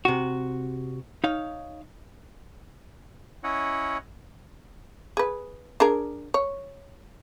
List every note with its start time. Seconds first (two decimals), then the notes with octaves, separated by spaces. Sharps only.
0.05 C3 F#4
1.24 D#4 C#5 F5
3.44 C#4 E4 C#5 D#5 F#5
5.17 G#4 B4
5.80 D4 G#4 A#4
6.34 C#5